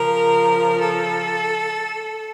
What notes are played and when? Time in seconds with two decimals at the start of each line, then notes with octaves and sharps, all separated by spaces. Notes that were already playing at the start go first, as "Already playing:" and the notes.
Already playing: C#3 F3 A#4
0.79 A4